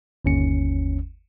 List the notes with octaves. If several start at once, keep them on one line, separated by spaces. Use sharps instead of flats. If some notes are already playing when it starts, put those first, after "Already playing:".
G1 D#2 C#4 C#7